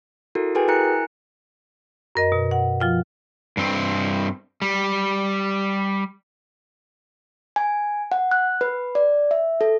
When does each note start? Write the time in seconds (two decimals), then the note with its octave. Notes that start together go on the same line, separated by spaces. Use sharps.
0.35 E4 F#4 A4 A#4
0.55 F#4 G#4 A4 B4 G5 G#5
0.68 E4 A#4 G#5 A#5 F#6 C#7
2.15 F#2 A#4 D#5
2.32 B2
2.51 F#5
2.80 F3 F4 G5
3.57 G2 C4
4.62 G3
7.56 G#5
8.12 F#5
8.31 F#6
8.61 B4
8.95 D5
9.31 E5
9.61 A4